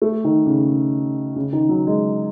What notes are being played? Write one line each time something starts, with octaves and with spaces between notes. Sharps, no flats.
A3
D#3
C#3
C#3
D#3
F#3
G#3